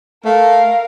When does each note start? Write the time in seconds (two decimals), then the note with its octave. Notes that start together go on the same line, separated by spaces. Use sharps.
0.25 A3 A#4 F5